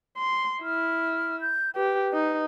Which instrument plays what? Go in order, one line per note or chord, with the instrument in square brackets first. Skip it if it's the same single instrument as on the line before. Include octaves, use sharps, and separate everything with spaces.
[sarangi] C6
[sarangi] E4 [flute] F6
[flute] G6
[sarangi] G4 [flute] B4
[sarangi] D#4